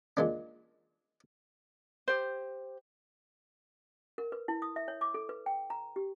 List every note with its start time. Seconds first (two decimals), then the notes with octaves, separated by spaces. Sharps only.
0.17 A#2 G#3 D4
2.08 G4 C5
4.18 A#4
4.32 B4
4.48 E4
4.62 D#6
4.76 E5
4.88 C#5
5.01 D6
5.14 A4
5.29 B4
5.46 G5
5.70 A#5
5.96 G4